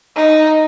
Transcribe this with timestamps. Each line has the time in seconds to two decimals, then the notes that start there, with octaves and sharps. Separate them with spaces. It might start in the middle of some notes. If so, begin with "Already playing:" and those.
0.16 D#4